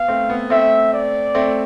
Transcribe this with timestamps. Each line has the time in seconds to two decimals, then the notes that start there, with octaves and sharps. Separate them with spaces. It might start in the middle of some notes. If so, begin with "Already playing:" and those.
Already playing: B3 F5
0.08 A3 C4
0.30 B3
0.50 A3 C4 E5
0.93 D5
1.35 A3 C4